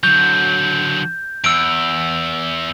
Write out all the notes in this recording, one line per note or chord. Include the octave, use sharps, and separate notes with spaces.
D3 F#3 G6
E2 E6 D7